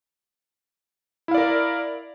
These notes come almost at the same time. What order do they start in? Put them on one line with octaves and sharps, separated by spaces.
E4 F5 D5 A#4